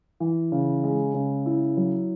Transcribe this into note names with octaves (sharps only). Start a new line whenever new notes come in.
E3
C#3
G#3
C#3
E4
F#3